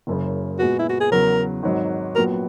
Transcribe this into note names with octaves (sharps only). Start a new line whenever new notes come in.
F#1 F#2 C#3
A#2 G#3 B3 F#4
E4
F#4
G#4
E2 C#3 F#3 A#4
G#1 G#2 F#3
A#1 A#2 F#3 B3 F#4 A#4